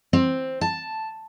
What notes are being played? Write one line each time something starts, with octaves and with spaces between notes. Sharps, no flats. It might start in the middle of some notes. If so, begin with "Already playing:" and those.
C4
A5